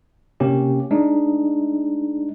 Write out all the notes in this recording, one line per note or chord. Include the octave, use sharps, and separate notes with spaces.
C3 A#3 C#4 G4
G#3 D4 D#4